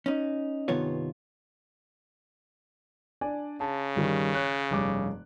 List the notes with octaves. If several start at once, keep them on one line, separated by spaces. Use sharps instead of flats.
C#4 D#4
G2 C3 D#3 B3 F4 C#5
D4 D5 G#5
C#3 A5
G2 D#3 G3
C#5 F#6
F1 G2 D6